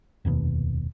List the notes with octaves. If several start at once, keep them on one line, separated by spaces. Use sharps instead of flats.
F1 D#2 G#2 B2